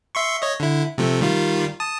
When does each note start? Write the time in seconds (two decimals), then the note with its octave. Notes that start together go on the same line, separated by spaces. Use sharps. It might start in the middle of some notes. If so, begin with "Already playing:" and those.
0.15 E5 C6 C#6
0.42 C#5 D#5
0.60 D3 E4
0.98 C3 F3 A3
1.21 D#3 G3 F4
1.80 A5 D#6